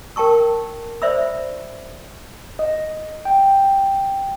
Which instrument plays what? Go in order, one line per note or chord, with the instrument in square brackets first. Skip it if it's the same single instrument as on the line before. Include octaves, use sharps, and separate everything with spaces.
[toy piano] A#4 G5 A5 C#6 E6
C5 D5 E5 B5 E6
[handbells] D#5
G5